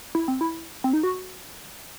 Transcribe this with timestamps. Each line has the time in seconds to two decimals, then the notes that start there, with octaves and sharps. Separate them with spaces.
0.15 E4
0.28 C4
0.41 E4
0.84 C4
0.93 D#4
1.03 F#4